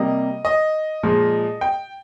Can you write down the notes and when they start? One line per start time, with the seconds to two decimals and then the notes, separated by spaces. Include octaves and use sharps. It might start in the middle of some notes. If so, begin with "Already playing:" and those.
Already playing: C3 G3 A#3 D#5
0.45 D#5
1.03 A#2 F3 G#3
1.61 G5